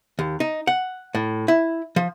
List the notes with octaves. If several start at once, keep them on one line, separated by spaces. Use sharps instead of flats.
D#2
D#4
F#5
A2
E4
F3